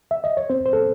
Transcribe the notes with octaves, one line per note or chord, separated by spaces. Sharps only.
E5
D#5
C#5
C4 C5
C5
A4